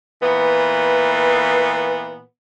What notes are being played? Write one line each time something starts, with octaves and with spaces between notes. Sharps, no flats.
A#2 E3 B3